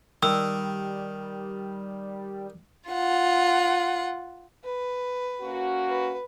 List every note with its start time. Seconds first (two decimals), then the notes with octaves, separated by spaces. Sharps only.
0.23 D#3 G3 E6
2.90 F4 F#5
4.65 B4
5.41 A#3 C#4 F#4
5.89 B4